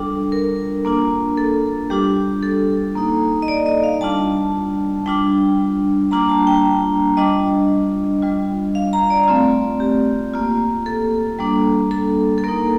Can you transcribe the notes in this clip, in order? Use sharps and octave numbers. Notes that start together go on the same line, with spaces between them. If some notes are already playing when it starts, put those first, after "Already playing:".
Already playing: G3 D4 F4 A4
A#4
A#3 D4 F4
A4
G3 D4 F4 G4
A4
A#3 D#4
D#5
D5
D#5
F5
G3 D4 F4 A5
G3 D4 F4 G5
G3 A#3 D4 F4 A#5
A5
G5
G3 D4 F4 D#5
G3 D4 F4
F5
A#5
D5
A3 C4 F4
G4
A#3 F4
A4
G3 A#3 D4
A4
A4
A#3 D#4 A#4